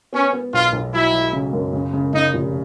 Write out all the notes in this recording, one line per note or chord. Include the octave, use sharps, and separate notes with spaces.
B3 C#4
B3
B1 F4
B1
F#3 E4
F#3
C#3
F#2
C#3
C#3
C#3 D#4
F1